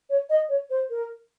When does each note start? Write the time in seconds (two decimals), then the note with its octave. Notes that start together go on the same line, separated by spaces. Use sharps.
0.10 C#5
0.30 D#5
0.49 C#5
0.70 C5
0.90 A#4